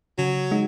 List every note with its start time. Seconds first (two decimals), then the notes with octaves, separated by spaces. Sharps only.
0.18 C#3 F#3
0.51 G#3 D#4 F#4